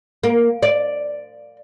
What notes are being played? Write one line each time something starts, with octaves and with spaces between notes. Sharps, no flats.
A#3
D5